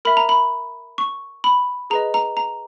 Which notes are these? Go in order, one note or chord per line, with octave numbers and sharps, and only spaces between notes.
A#4 E5 B5
A#5
B5
C#6
B5
G#4 B4 D#5 A#5
A#5
A#5